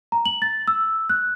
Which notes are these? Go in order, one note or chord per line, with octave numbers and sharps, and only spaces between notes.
A#5
F#7
A6
E6
F#6